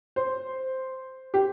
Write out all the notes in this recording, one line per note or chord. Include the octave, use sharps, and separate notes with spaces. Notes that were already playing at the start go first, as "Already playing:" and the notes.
C5
G4